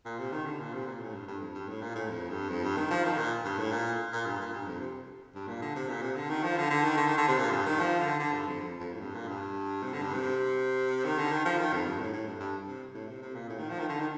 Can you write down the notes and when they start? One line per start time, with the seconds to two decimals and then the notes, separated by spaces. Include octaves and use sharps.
0.06 A#2
0.19 C3
0.32 D#3
0.46 D3
0.60 A#2
0.74 C3
0.87 A#2
1.00 A2
1.14 G2
1.28 G2
1.41 F2
1.54 G2
1.69 A2
1.82 A#2
1.95 A2
2.09 F2
2.30 G2
2.49 F2
2.63 G2
2.77 D#3
2.91 F3
3.04 D#3
3.17 A#2
3.45 G2
3.58 A2
3.72 A#2
4.13 A#2
4.26 G2
4.40 A#2
4.53 G2
4.66 F2
4.80 C3
5.35 G2
5.48 A#2
5.62 D3
5.76 C3
5.89 A#2
6.03 C3
6.16 D3
6.29 D#3
6.43 F3
6.57 D3
6.71 D3
6.84 D#3
6.97 D3
7.08 D#3
7.18 D3
7.28 C3
7.38 A#2
7.51 G2
7.66 D#3
7.79 F3
7.99 D3
8.19 D3
8.33 G2
8.47 F2
8.60 F2
8.80 F2
8.93 A2
9.01 G2
9.15 A#2
9.28 G2
9.83 C3
9.93 D3
10.02 G2
10.14 C3
11.05 D#3
11.18 D3
11.32 D#3
11.45 F3
11.59 D#3
11.73 F2
11.86 G2
12.00 A2
12.13 A2
12.27 G2
12.40 G2
12.68 C3
12.95 A2
13.08 C3
13.22 C3
13.35 A#2
13.49 A2
13.59 D#3
13.69 F3
13.80 D#3
13.89 D3
14.00 D#3